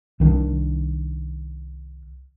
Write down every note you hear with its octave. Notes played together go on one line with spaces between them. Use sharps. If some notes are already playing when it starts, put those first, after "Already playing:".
C2 D#3 D4